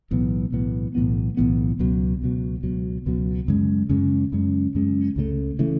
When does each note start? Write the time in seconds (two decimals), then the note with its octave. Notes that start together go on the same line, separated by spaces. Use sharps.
0.11 B1 A2 E3 B3
0.52 B1 A2 E3 B3
0.95 B1 A2 E3 B3
1.37 B1 A2 E3 B3
1.79 C#2 B2 F#3
2.22 C#2 B2 F#3
2.63 C#2 B2 F#3
3.06 C#2 B2 F#3
3.48 F#2 C#3 G#3 C#4
3.89 F#2 C#3 G#3 C#4
4.32 F#2 C#3 G#3 C#4
4.75 F#2 C#3 G#3 C#4
5.16 C#2 C#3 E3 A3
5.59 C#3 E3 A3